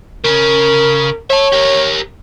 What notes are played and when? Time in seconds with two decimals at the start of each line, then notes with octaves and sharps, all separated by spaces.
0.24 C#3 C#4 A#4
1.30 C#5 E5 A5
1.53 G4 A#4